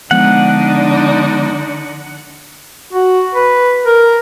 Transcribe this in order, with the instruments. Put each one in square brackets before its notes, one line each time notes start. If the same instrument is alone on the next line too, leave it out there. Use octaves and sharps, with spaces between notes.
[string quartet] D3 D4 D#4 [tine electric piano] F3 G#3 B3 [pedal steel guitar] F#5
[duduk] F#4
B4
A#4